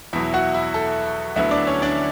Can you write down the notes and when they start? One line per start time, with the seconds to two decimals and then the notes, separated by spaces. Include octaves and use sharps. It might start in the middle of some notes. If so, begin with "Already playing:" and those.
0.13 E2 B2 F#3 E4 E5
0.34 F#4 F#5
0.54 E4 E5
0.74 A4
1.36 D2 D3 F#3 B3 E4 E5
1.51 D4 D5
1.67 C#4 C#5
1.82 D4 D5